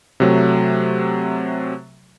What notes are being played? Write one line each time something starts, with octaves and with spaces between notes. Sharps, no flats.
C3 F#3 A3